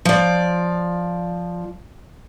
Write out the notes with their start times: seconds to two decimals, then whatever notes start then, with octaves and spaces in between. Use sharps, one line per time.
0.05 F3 D5